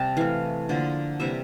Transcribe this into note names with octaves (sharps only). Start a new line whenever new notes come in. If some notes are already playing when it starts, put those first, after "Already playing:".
Already playing: C3 G3 A5
E3 A3 F5
D3 F3 A#3
C3 E3 G3 A#3 E5